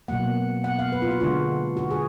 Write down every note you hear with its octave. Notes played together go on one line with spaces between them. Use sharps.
B2 F#3 A#3 F#5
F#5
F5
B4
F4
F#4
D3 G#3 D4 F4
F#4
G#4